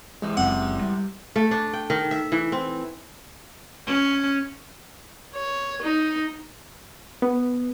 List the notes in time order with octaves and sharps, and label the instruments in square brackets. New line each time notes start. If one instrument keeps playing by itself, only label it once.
[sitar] E2 C3 [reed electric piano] G#3
[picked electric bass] F#1 F#2 C4 [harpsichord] F#5
[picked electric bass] G3
[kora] A3
D4
G5
D#3
E5
E3
C4
[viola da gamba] C#4
[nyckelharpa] C#5
D#4
[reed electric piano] B3